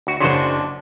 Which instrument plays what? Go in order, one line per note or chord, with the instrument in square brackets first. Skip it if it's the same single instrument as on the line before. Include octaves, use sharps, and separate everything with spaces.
[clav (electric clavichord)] D2 F#4
[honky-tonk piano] F#1 C6 [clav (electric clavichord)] C#3 F#4 C5 [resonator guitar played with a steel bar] F#3 D4